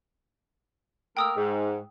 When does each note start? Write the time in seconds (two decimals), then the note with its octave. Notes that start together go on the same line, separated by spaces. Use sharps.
1.17 A3 A#3 A#4 G5 D#6 E6
1.35 G#2